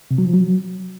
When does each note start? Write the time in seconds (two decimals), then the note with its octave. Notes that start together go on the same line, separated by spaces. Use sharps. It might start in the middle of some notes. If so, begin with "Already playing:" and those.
0.11 C3
0.18 F#3
0.26 F3
0.34 F#3